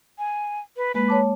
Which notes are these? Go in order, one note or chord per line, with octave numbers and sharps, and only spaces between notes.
G#5
B4
G#3 A#3 B4
C#5 A5 D6